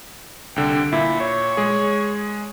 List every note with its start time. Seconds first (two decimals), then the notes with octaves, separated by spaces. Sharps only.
0.56 C2 D3 G5
0.93 A#2 E4
1.21 C#5
1.57 G#3 G#4